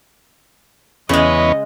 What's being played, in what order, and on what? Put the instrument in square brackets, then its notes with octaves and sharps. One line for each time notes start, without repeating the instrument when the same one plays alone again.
[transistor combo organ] E2 B3 C#4 [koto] C#3 G#3 [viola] D#5